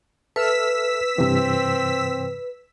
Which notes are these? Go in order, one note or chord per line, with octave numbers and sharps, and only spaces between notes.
A4 B4 E5 E6 F6 B6
G2 C3 E3 C4